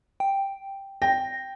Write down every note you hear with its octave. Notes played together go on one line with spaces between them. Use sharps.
G5
G5 A#6